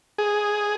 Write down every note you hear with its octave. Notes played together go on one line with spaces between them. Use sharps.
G#4